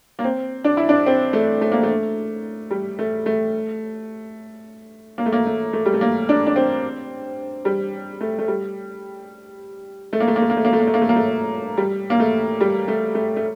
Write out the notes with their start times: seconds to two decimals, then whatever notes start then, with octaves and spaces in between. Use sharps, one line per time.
0.19 A#3
0.24 C4
0.64 D4
0.77 E4
0.89 D4
1.06 C4
1.33 A3
1.61 A3
1.72 A#3
1.83 A3
2.71 G3
2.99 A3
3.26 A3
5.18 A#3
5.26 A3
5.32 A#3
5.46 A3
5.73 A3
5.86 G3
5.94 A3
6.01 A#3
6.29 D4
6.47 D4
6.56 C4
7.65 G3
8.21 A3
8.39 A3
8.48 G3
10.13 A3
10.20 A#3
10.28 A3
10.36 A#3
10.42 A3
10.50 A#3
10.57 A3
10.65 A#3
10.73 A3
10.80 A#3
10.87 A3
10.94 A#3
11.02 A3
11.09 A#3
11.16 A3
11.77 G3
12.10 A#3
12.20 A3
12.61 G3
12.88 A3
13.15 A3
13.36 A3